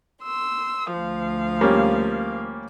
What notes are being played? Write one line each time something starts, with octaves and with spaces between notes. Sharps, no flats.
C6 E6
D2 F3 F5
G3 A#3 C#4